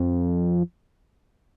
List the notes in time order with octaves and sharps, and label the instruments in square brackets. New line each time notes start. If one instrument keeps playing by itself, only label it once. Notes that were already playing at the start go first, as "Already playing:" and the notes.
Already playing: [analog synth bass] F2